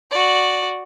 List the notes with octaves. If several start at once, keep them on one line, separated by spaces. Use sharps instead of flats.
F#4 D5